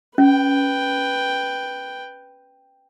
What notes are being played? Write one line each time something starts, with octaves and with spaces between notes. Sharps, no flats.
C#4 B4 G5